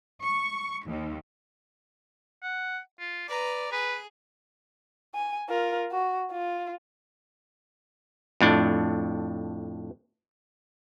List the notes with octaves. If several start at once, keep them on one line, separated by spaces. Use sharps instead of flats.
C#6
D#2
F#5
F4
B4 D5 A#5
G#4 B4
G#5
F4 A#4
F#4
F4
F2 A2 D4